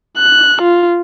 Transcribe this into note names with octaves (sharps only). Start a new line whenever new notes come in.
F#6
F4